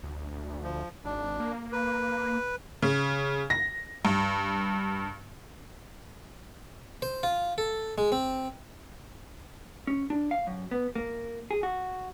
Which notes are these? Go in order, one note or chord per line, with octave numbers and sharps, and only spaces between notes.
D2
F3
G#1 D4
A#3
B4
C#3
A#6
G2
C5
F4
A4
G#3
C4
C#4
D4
F5
F#2
B3
A#3
G#4
F#4